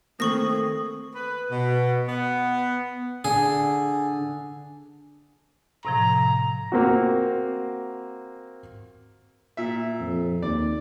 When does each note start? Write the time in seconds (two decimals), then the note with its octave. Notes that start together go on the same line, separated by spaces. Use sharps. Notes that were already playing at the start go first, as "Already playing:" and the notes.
0.20 D#3 A3 A#3 C4 A4 C#6 D#6 A#6
1.14 B4
1.50 B2
2.08 B3
3.25 D3 G#4
5.85 A2 C3 F3 A#5
6.72 A#3 C4 F#4
9.57 A#2 E5
10.01 F2
10.42 D#2 D5